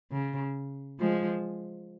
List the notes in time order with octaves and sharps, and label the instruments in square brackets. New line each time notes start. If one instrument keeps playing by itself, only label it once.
[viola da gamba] C#3
F3 G#3